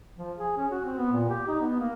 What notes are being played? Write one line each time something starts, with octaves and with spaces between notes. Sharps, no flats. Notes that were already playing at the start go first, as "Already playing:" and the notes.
F3
G#4
C#4
F#4
C4
B3
A#2
G4
D#4
B3
A#3